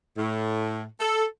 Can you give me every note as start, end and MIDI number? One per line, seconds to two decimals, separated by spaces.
0.17 0.84 45
0.99 1.24 69